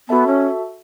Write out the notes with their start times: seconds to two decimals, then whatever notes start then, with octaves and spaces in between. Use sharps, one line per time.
0.08 B3 F#4 A4 E5 A5
0.27 C#4